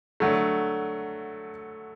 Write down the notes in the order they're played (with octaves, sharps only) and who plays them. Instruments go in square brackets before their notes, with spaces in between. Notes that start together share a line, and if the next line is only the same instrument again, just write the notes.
[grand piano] D3 F#3 A3